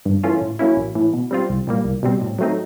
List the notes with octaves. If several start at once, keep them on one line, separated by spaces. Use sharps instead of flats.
G2
E3 A3 C#4 F4
A2
F#3 A#3 C#4 E4
A1
A2 E3
B2
G3 C4 F4
C2
A#2 G3 A#3
C2
B2 G3 C4
A2
F#3 A3 C4 D#4